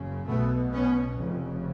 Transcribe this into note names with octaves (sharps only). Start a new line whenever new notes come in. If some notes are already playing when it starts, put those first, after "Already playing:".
Already playing: F#1 F#2 C#3
B1 B2 A3 B3
B3 C#4
F1 F2 C#3